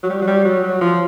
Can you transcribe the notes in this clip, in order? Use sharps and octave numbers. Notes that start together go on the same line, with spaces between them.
F#3
G3
F#3
G3
F#3
F#3
F3